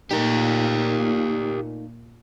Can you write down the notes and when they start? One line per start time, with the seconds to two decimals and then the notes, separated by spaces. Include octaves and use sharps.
0.11 A#2 A3 A#3 D#4 G4 A#4